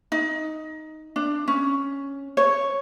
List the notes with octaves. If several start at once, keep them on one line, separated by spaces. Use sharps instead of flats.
D#4
D4
C#4
C#5